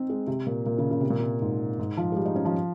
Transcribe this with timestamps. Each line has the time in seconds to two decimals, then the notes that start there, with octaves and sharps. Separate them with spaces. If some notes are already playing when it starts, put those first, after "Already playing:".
Already playing: C4 D#4
0.10 G#3
0.27 C3
0.46 A#2
0.66 A#2
0.78 C#3
0.91 C#3
1.01 C3
1.10 A#2
1.20 C3
1.42 G#2
1.79 G#2
1.97 F3
2.12 G#3
2.16 G3
2.25 D#4
2.36 C#4
2.45 F3